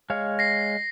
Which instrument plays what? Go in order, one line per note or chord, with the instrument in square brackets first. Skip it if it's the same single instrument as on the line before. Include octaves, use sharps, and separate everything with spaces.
[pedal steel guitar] G#3 C#5 F5
[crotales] A#6 C7